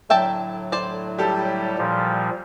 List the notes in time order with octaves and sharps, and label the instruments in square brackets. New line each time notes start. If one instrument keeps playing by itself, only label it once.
[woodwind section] A2 D3 F#3 [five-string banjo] E5 G5 A5
[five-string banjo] C5 D5
[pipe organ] G3 [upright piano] G4 A4
[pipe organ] A#2 F3 G3